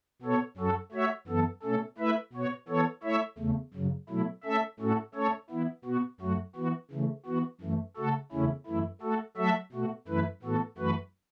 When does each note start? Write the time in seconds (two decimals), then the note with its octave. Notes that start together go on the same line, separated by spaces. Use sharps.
0.22 B2 B3 A4 C#5
0.57 F#2 F#3 C#4 F#4 A4
0.92 A3 F#4 C#5 E5
1.27 F#2 E3 B3 A4
1.63 B2 A3 C#4 A4
1.98 A3 E4 B4 E5
2.33 B2 B3 F#4 C#5
2.68 E3 B3 A4 C#5
3.03 A3 E4 C#5 E5
3.38 E2 C#3 A3
3.74 F#2 C#3 F#3
4.09 B2 F#3 A3 E4
4.44 A3 C#4 A4 E5
4.79 A2 A3 C#4 F#4 A4
5.15 A3 C#4 A4 C#5
5.50 E3 B3 E4
5.85 B2 B3 F#4
6.20 F#2 F#3 A3 F#4
6.56 E3 B3 F#4
6.91 C#3 E3 A3
7.26 E3 B3 F#4
7.61 F#2 E3 A3
7.97 C#3 A3 F#4 A4
8.32 E2 C#3 A3 C#4 E4
8.67 F#2 E3 A3 E4
9.01 A3 F#4 A4
9.37 F#3 A3 F#4 A4 E5
9.72 B2 A3 F#4
10.08 F#2 E3 A3 E4 B4
10.42 A2 E3 B3 F#4 A4
10.78 F#2 E3 A3 F#4 B4